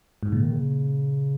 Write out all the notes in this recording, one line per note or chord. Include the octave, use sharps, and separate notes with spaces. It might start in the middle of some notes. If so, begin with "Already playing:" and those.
G#2
A#2 C#3
D#3
C#3